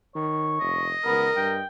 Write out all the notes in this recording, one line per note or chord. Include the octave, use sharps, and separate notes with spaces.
D#3 C#5
F1 D#5
C#2 B3 A#4
G2 G5